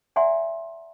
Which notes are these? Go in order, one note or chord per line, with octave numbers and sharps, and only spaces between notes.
D5 E5 F#5 G#5 A#5 C6